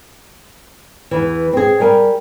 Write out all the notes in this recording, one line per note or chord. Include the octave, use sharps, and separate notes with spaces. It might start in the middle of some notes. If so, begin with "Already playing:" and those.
E2 E3
C4 G#4
G3 A#4 G#5